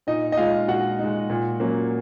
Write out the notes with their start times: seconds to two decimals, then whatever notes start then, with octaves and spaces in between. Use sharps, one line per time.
0.07 A#2 D#4 D#5
0.32 D#5
0.37 G#3 D#4 F4 F5
0.68 A#2 F#4 F#5
0.99 D#4
1.04 G#3
1.30 A#2
1.60 F#3 A#3 C#4